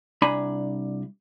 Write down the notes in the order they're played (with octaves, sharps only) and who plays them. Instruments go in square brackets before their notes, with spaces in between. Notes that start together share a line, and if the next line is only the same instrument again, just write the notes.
[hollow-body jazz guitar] C2 D4 G#5 A#5 B5